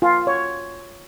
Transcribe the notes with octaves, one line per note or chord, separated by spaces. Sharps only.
F4
C#5